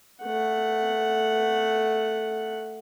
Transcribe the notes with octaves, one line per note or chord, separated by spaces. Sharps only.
A3 F#5